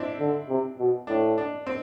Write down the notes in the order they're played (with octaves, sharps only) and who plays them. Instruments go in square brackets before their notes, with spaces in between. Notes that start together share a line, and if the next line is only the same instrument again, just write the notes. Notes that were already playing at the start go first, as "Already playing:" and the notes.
Already playing: [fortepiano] C4 D4 E4
[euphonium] D3
C3
B2
[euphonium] A2 [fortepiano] D4
[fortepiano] D4
C4